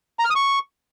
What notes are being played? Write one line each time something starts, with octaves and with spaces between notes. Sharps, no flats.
A#5
F6
D#6
C#6